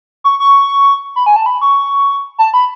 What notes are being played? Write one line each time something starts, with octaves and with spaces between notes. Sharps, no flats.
C#6
C#6
B5
G#5
A5
B5
C#6
A5
B5